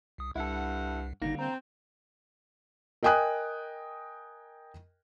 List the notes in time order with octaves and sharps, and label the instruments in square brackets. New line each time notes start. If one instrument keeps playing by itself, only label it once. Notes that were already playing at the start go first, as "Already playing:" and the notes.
[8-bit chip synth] C2 D#6
[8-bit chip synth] C2 [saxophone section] G2 F#5 [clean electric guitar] E4 A4
[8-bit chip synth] G#1 D#4 A#6 [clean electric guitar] D3 G3 A#3
[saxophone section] C4 [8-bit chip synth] A#5
[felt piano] A#4 D#5 G5 G#5 D#6 F#6